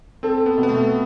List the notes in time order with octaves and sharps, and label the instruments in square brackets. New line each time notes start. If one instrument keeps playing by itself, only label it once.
[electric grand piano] C4 [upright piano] A4
[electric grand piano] B3
[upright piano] B2
[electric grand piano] B3
A3